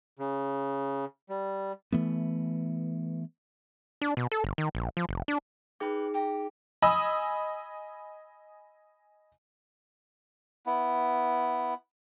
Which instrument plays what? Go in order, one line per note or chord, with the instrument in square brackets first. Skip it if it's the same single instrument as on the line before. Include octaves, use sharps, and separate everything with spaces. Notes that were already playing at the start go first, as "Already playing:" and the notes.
[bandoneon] C#3
G3
[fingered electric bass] E3 A3 B3
[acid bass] D4
B2
A4
G1
D#3
A#1
F3
F1
D4
[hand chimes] D#4 G#4 D6 [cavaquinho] B4 G5
[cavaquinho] G4 G5 A#5
[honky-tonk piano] D#5 G#5 B5 D#6 E6
[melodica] B3 E4